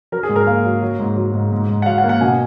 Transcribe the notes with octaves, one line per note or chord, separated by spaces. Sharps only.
F#3 A#4
G#4
G#2
A#4
A#3 F5
F#3
F#3
G#2
F#3
G#2
G#2
G#2
F#5
F#3 F5
F#5
A#3
F#5
B2 G#5